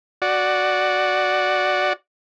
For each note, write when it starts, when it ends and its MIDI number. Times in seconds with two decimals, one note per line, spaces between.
0.22 1.93 66
0.22 1.93 74